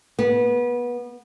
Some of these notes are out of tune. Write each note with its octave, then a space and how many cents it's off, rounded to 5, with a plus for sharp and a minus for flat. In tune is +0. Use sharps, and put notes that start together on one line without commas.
B3 -25